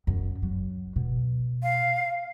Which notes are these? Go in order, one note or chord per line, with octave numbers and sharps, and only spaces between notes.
F#2
F#3
B2
F5